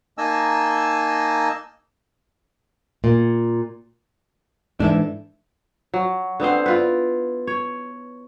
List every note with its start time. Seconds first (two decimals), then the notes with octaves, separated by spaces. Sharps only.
0.18 A#3 D#4 D#5 G#5 A5 E6
3.04 A#2
4.80 G#2 E3 D4 A4 E5
5.94 F#3
6.40 D3 B3 C4 C5
6.66 E4 F4 B4
7.47 C#5